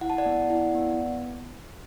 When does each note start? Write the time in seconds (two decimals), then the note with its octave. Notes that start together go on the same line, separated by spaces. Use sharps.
0.01 E4 F#5
0.10 A5
0.18 D5 F#5
0.26 B3
0.50 E4
0.75 B3